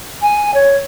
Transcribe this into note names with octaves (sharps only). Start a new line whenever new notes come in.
G#5
C#5